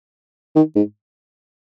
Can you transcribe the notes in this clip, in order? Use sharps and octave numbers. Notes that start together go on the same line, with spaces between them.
D#3
G#2